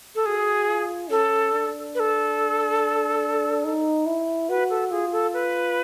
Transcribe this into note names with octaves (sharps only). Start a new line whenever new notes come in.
A4
F#4 G#4
F4
C#4 A4
D4
B4
A4
D#4
E4
F#4 B4
A4
F4 G#4
A4
B4